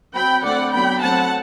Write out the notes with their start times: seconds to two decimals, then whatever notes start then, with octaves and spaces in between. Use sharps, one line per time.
0.14 F#3 C4 G5 B5
0.43 D3 A3 C4 D5 F#5
0.72 F#3 B3 D4 G5 B5
1.01 F#3 A3 C4 F#5 A5